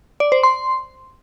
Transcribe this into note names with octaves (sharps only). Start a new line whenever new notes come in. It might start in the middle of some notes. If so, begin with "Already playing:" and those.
D5
C5
C6